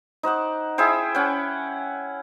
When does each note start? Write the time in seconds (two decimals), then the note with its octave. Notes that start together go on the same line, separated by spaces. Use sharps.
0.23 D#4 C5 F#5 D6
0.78 E4 G#4 C5 G5
1.15 C#4 F#5 G5